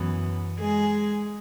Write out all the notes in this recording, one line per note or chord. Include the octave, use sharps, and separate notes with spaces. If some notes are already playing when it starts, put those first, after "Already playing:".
Already playing: F#2 E3 B3
G#3 G#4